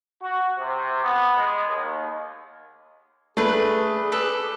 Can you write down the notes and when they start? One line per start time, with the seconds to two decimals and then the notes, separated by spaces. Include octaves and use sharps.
0.22 F#4
0.59 C3
1.03 B3
1.36 G#3
1.69 D#2
3.37 A3 D4 G#4 B4
4.12 G4 A4 B4